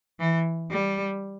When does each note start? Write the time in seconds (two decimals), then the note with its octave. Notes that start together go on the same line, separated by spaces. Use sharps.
0.20 E3
0.71 G3